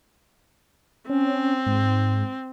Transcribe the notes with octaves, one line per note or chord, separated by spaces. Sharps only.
C4 C#4
G#2